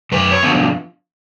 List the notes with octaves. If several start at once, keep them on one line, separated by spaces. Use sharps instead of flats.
F#2 B4
C#5
F3 B3 D4